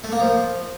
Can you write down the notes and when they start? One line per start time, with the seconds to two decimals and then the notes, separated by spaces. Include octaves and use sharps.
0.04 A3
0.12 A#3
0.20 F3